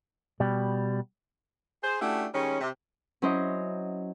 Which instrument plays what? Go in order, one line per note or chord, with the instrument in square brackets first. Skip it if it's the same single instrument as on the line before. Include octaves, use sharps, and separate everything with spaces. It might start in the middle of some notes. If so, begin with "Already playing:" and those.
[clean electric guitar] B2 G3
[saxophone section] G#4 C5
A3 C#4 D4 E4 F#4 G4
D#3 G3 G#3 C#4
C3
[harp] F#3 C#4 E4 C5 D#5